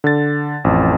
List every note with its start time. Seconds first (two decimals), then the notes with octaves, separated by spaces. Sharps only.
0.04 D3 A6
0.64 A1 F2